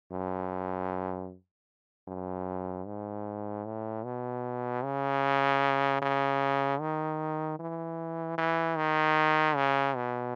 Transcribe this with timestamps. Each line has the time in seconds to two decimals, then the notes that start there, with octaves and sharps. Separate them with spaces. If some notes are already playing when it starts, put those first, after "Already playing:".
0.11 F#2
2.08 F#2
2.86 G#2
3.65 A2
4.05 B2
4.84 C#3
6.02 C#3
6.80 D#3
7.59 E3
8.38 E3
8.77 D#3
9.56 C#3
9.96 B2